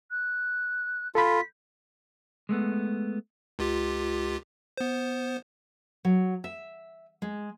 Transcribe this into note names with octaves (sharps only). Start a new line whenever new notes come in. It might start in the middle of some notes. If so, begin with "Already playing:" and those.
F#6
F4 A4 B5 B6
G#3 A3 B3
C#2 F4 G4
B3 C5
F#3
E5
G#3